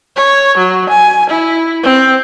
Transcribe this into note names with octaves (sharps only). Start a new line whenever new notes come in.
C#5
F#3
G#5
E4
C4